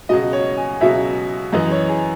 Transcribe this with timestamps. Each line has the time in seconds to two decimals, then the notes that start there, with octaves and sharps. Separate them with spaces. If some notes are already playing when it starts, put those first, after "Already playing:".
0.09 C#2 B2 F#3 D#5
0.33 C#5
0.57 G#5
0.81 C#2 B2 F#3 E5
1.53 F#2 E3 D#5
1.71 C#5
1.89 G#4